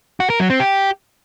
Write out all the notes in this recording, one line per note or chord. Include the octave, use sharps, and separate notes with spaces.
F#4
A#4
F#3
C4
G4